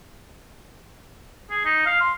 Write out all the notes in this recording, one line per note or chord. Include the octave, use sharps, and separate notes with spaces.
G#4
D#4
F5
C6